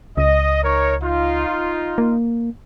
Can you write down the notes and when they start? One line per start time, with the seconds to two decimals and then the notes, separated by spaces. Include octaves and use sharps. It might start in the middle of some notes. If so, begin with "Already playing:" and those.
0.17 C#2 D#5
0.62 D#4 A#4 C#5
1.02 D#4 F4
1.98 A#3